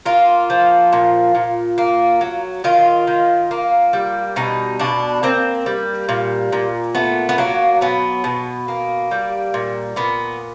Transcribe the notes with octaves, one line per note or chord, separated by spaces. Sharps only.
A#3 F4
F3
A#2
A#2
A#3
F#3
D#3 F4
D#3
A#3
G3
B2 D#4
B2 D4
A#3 C4
G3
A#2
A#2
A3 B3
B3
F#3 A#3
B2 B3
B2
A#3
G3
A#2
A#2 B3